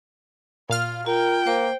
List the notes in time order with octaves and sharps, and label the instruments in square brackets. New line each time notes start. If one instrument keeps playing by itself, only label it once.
[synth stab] A#2 F5 F6 [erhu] F4
[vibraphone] F4 [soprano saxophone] A#4 [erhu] G5
[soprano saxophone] A#3 [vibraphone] C5